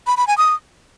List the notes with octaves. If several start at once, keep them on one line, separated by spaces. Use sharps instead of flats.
B5
B5
G#5
D#6